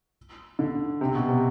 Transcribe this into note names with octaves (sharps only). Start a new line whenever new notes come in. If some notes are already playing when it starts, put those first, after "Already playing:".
D3
C3
B2
C3